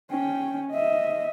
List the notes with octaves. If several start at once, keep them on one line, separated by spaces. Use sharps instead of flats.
C#4 G5
D#5 E5